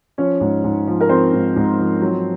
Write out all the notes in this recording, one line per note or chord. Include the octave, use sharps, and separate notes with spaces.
F3 C#4 C#5
G#2
G#2
F3
A#4
F3 C4 C5
G#2
G#2
F3
F#3